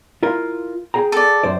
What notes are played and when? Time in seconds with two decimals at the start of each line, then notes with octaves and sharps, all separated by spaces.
0.23 E4 F4 A#4
0.94 G#4 G5 A#5
1.12 A4 D5
1.44 F#2 C5 D5